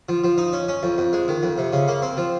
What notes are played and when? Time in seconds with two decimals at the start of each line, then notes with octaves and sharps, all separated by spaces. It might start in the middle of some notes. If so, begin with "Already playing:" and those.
0.09 F3
0.24 F3
0.38 D#4
0.53 C#4
0.68 C#4
0.83 F2
0.98 F2
1.13 G#3
1.28 D#3
1.43 F2
1.58 C3
1.73 C#3
1.88 A#3
2.02 C4
2.17 F3